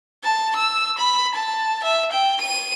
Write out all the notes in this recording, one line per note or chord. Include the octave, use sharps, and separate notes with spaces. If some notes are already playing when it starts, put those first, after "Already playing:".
A5
E6
B5
A5
E5
G5
D#7